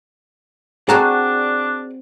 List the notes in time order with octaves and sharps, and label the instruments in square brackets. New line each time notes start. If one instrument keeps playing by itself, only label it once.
[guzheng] C4 F#4 A5 [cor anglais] D4 [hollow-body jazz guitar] G#4 D5 A#5